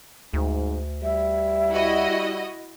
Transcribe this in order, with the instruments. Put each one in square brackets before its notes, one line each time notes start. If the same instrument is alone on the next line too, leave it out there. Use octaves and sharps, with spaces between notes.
[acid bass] D2 [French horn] G#2
[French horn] G3 [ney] E5
[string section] E4 F#4 D#5